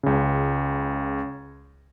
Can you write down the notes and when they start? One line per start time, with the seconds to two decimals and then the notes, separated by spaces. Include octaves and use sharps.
0.03 C#2 C#3